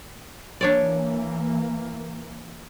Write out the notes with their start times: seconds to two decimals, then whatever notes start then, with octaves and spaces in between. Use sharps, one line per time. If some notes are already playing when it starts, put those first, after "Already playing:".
0.61 E3 A#3 D4 C#5 D5